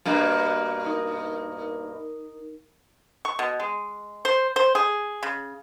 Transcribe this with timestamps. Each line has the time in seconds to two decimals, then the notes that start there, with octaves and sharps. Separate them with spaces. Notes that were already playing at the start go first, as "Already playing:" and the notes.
0.05 G2 B2 A#3
0.87 D#4 A#4
3.25 C#6
3.39 B2
3.60 G#3
4.25 C5
4.56 C5
4.75 G#4
5.23 C#3